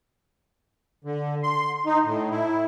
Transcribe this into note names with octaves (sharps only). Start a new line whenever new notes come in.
D3
C6
D#4
A2
E4